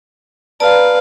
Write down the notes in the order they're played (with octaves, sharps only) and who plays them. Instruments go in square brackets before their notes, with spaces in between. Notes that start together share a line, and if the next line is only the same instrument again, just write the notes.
[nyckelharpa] B4 F5 [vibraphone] D5 A5 A#5